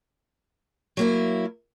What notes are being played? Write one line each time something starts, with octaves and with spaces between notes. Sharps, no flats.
F#3 A#3 E4